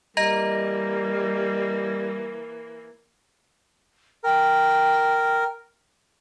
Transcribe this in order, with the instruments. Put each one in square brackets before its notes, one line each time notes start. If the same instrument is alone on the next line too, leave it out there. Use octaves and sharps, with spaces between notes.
[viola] E3 A#3 [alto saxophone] G3 [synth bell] D#5 A#5 A#6
[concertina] A#4 [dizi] G5